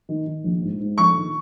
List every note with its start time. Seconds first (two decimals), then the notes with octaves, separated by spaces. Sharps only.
0.09 D#3
0.26 D#3
0.44 A#1
0.62 G#2
0.81 G#2
0.98 A#1 C#6
1.16 D#3